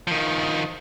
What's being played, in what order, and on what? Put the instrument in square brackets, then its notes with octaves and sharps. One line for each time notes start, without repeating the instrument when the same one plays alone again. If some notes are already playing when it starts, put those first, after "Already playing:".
[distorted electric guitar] D#3 F3